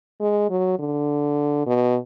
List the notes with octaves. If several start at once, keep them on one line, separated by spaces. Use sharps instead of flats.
G#3
F#3
D3
B2